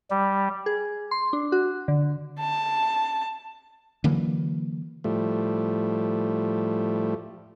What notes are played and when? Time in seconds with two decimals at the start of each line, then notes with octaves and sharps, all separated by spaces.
0.11 G3
0.66 G#4
1.11 C6
1.33 D4
1.52 F#4
1.88 D3
2.41 A5
4.04 D3 E3 F#3 A#3
5.04 A2 F3 G3 A3